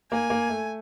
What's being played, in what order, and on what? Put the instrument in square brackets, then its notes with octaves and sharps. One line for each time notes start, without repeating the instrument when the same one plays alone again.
[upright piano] A#3 [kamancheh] G#5
[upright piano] A#3
A3